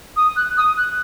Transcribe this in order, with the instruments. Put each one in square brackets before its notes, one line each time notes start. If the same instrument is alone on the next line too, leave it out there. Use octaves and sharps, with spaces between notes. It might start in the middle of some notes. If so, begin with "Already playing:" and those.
[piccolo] D#6
F#6
D#6
F#6